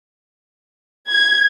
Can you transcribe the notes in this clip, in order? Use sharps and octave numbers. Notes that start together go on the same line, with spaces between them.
G#6